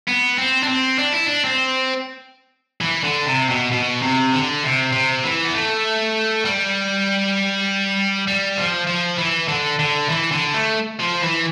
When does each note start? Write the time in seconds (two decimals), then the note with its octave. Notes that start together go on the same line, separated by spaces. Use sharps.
0.08 B3
0.38 C4
0.63 D4
0.68 C4
0.99 D4
1.13 E4
1.26 D4
1.45 C4
2.81 E3
3.03 D3
3.26 C3
3.49 B2
3.72 B2
4.02 C3
4.33 D3
4.63 C3
4.93 C3
5.24 E3
5.45 B3
5.54 A3
6.45 G3
8.27 G3
8.57 F3
8.87 F3
9.18 E3
9.48 D3
9.79 D3
10.09 E3
10.31 D3
10.54 A3
11.00 F3
11.23 E3